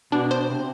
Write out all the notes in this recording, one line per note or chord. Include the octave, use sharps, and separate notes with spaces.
B2 D4
C5
C3